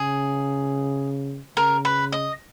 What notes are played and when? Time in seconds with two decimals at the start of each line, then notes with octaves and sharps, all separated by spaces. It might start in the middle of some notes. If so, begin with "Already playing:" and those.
Already playing: C#3 G#4
1.57 C#3 A#4
1.85 B4
2.12 D#5